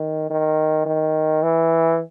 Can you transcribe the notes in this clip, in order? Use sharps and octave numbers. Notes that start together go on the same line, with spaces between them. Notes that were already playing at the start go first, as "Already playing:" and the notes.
Already playing: D#3
D#3
D#3
E3